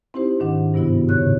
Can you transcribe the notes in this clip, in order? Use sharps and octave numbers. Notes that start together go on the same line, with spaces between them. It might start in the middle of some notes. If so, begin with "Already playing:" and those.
C4 D#4 E4 G4 C5
G#2 D#3 D4 F#5
G2 C3 B3 E4 F#4
D#2 A2 C#3 C#5 F#6